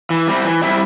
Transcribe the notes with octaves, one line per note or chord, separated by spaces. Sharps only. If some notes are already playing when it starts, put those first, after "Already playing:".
E3
G3 C4 E4
E3
G3 C4 E4